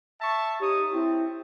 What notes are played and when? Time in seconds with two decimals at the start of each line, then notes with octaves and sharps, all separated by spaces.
0.21 E5 A5 C#6
0.61 D#4 G4 C#5 D#6
0.93 C4 E4